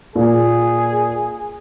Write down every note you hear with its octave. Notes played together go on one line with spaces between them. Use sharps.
A#2 G#4